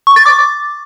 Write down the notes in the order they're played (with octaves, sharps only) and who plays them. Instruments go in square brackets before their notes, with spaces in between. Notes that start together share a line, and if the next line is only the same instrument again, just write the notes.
[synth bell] C#6
A6
D6